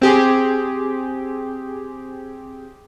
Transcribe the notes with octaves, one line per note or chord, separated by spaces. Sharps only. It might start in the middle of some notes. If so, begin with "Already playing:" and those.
C4 G4 G#4